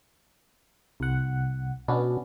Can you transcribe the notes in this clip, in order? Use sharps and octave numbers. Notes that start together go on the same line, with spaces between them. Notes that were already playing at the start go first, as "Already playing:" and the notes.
C2 F#5
B2 B3 C#4 D4